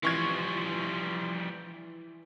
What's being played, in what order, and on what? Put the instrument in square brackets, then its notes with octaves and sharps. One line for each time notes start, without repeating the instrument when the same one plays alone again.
[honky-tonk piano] E3 C#6 G#6 [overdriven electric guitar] F3 G3